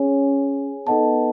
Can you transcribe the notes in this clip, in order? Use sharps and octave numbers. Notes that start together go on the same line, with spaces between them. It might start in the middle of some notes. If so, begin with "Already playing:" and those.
Already playing: C#4 G#4 C#5 G#5
B3 D#4 A4 D#5 F#5 A5